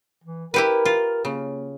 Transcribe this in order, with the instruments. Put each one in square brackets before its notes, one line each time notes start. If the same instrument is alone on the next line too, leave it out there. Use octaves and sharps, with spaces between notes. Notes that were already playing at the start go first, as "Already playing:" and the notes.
[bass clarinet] E3
[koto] E4 G4 B4 [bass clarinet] A#4
[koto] F4
[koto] C#3 [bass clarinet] A#3